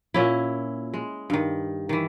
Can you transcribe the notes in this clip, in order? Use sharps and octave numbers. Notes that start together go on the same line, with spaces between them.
A#2 C#4 E4
G#3
G2 D#3
D#3 E3